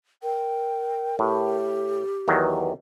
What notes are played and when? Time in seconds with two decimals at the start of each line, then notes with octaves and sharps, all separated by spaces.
0.23 A#4 G5
1.19 A2 G4
2.28 E2 D#3 F#3 B4